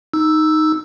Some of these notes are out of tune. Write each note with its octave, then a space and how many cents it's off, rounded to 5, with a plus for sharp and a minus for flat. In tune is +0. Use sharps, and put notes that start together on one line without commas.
D#4 +0 E6 +0